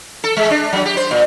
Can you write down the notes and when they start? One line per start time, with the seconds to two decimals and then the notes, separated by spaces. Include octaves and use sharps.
0.24 A4
0.37 G#3
0.51 D4
0.73 F#3
0.86 G4
0.97 C5
1.11 A#2